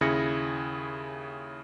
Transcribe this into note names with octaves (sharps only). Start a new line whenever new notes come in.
D#2 C#3 E4 G#4 A#6 C#7